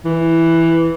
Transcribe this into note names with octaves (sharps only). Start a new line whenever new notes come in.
E3